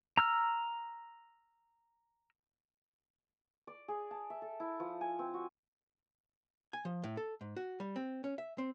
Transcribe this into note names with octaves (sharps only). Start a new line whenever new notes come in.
A#5 E6 F6
D5
G#4
A5
E5
A4
E4
F3
G#5
C4
F#4
G#5
F3
A2
A4
G#2
F#4
G3
C4
C#4
E5
C4